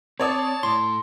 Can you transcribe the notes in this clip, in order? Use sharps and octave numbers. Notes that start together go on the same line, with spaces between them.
C4 C#5 D5 A5 D#6
A2 E4 C6